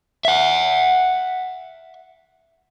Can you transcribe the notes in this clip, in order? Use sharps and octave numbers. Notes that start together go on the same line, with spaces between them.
E5 F#5